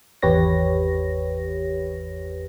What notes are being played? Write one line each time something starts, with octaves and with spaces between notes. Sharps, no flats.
G#1 E2 G4 B4 C#5 A#6